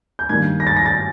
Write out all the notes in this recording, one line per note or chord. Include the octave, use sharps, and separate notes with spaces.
G6
G2 D#3 G3 A#3 G#6
A#6
A6
A#6
A6